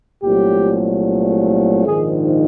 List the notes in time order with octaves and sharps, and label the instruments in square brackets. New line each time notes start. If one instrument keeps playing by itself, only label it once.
[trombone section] C2 A#2 F#3 A3 G4
A#1 G#2 D#3 G#4